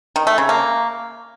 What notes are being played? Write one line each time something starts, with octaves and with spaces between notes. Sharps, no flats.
D#3
A3
C#3
A#3